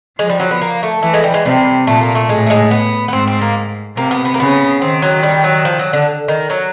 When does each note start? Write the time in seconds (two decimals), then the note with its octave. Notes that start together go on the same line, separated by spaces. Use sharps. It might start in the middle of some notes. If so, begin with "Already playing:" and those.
0.19 F3 G#3
0.30 G3
0.40 F#3
0.51 B3
0.62 A#3
0.83 A3
1.03 E3 A3
1.14 G#3
1.24 G3
1.34 G#3
1.46 C3 G3
1.87 A#2 A3
2.01 A#3
2.15 A3
2.29 A2 G#3
2.46 A3
2.50 G#3
2.71 B3
3.08 B3
3.13 G#2 C4
3.27 C4
3.41 A#3
3.97 C3 A#3
4.11 B3
4.25 B3
4.34 A#3
4.39 C#3 B3
4.81 D#3 C4
5.02 F#3
5.23 G3
5.44 F#3
5.65 F3
5.79 F#3
5.93 D3
6.28 D#3
6.50 F#3